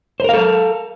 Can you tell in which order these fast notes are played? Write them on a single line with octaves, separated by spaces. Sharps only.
C5 A#4 F5 A4